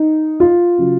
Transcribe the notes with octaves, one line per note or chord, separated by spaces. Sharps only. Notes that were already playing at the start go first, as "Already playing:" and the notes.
Already playing: D#4
F4
C#3 F#3